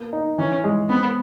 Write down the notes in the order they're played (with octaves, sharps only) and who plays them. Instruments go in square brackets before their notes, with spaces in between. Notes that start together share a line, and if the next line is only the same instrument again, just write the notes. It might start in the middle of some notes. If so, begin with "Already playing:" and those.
Already playing: [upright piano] A#3 B3
D#4
[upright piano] E3 [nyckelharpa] C#4
[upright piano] G#3
[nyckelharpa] B3 [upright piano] C4